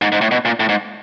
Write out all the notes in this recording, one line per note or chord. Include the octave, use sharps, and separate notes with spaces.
G#2
G#2
A2
B2
A#2
A2
G#2